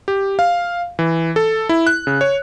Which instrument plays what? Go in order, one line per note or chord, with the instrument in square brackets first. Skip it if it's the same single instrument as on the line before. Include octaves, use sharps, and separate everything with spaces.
[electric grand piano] G4
F5
E3
A4
E4
F#6
C#3
C#5